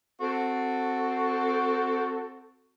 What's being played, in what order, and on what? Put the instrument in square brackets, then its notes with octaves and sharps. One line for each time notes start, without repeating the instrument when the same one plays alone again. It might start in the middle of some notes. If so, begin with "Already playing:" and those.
[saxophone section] C4 F#4 A4